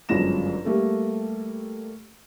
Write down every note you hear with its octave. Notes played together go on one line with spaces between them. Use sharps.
G1 F#2 F3 G#3 A#6 E7
G3 A3 A#3 A4